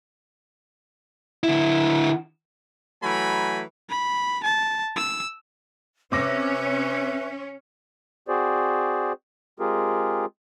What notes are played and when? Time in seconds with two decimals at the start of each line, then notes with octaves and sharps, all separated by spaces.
1.43 D3 E4
3.03 E3 F#3 A3 G#5 A#5 B5
3.90 B5
4.44 A5
4.96 E6
6.12 C3 C#4 B4 E5 D6 A#6
8.28 C4 F#4 G#4 C5 D5
9.60 G#3 C4 F4 G4 G#4 A#4